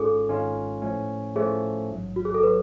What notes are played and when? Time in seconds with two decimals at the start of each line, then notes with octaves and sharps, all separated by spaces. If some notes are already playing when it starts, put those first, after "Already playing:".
Already playing: G#1 G#2 G#3 C#4 F4 G#4 A4
0.28 G#1 G#2 G#3 C#4 F4
0.82 A2 F3 A3 C#4
1.36 A2 F3 A3 C#4 G#4
1.90 A1 G#2 F#3
2.16 F#4
2.25 G#4
2.34 A4
2.43 F#3 B4